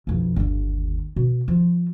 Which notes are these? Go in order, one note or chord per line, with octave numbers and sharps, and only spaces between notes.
B1 F2
G1 D#2
B2
F3 F4